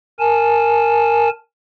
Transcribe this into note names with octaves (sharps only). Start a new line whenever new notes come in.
A#4 G#5 A5